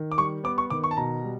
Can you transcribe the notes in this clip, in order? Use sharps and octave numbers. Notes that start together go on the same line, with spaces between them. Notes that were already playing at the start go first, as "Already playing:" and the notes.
Already playing: D#3
D6
G3 C#6
B3 D6
C#6
D#3 D6
C#6
A5
B2 A#5
G3